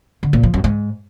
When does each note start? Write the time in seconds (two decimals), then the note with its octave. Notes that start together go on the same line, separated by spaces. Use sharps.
0.23 D3
0.33 A#2
0.43 F3
0.54 F#2
0.64 G#2